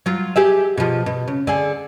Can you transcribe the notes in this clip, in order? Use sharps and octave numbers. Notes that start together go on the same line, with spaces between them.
F#3 F4
G4 G#4 E5
B2 F3
B2
C#3
D3 G#4